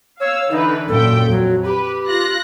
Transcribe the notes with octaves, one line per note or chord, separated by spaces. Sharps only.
C#5 F5 E6
D3 E3 D#4 B4
F#2 A#2 A4 G5
F2 F#3
G4 B4
F4 F#6 A#6